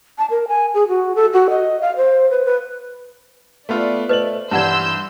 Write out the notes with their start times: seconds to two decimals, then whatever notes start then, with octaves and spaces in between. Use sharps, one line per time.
0.18 A5
0.30 A#4
0.48 G#5
0.74 G#4
0.88 F#4
1.15 A4
1.33 F#4
1.50 D#5
1.81 F5
1.96 C5
2.31 B4
2.45 B4
3.69 A3 B3 F4 D5
4.09 A3 B4 C5 D#5 F#7
4.51 G2 E3 D5 F#5 A5 C6 E6 G6